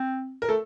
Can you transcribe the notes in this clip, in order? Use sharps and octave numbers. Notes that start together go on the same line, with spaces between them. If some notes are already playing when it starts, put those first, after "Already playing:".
Already playing: C4
A#4
A3 A4